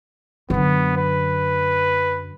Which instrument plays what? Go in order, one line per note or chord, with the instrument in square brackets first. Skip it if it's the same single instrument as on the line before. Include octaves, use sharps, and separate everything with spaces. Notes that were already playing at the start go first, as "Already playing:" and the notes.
[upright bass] F#2 D3 [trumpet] B3
[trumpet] B4